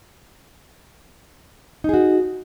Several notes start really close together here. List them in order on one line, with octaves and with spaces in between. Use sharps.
D#4 G#4 F#4